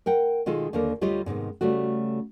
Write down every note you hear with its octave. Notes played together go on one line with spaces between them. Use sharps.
A#4 F#5 G5
B2 D#3 G#3 F4 A4
D#2 D3 A#3 A4 A#4
D2 G3 F4 G4 C#5 D#5
G#2 C3 D#3 B3
C#3 G3 A3 F#4